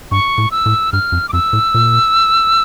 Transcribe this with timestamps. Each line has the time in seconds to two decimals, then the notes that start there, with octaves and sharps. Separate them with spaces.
0.11 G2 C#6
0.38 A2
0.51 E6
0.66 A2
0.92 G2 F6
1.12 F2
1.29 D6
1.33 F2 E6
1.53 A2
1.74 A#2